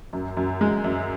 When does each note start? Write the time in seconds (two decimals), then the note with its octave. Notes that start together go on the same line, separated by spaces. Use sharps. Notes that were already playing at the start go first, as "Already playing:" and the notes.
0.13 F#2
0.37 F#2
0.61 G#3
0.84 F#2